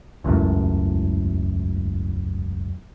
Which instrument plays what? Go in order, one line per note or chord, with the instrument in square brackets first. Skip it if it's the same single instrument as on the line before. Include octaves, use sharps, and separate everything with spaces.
[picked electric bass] E1 C#2 F#2 A2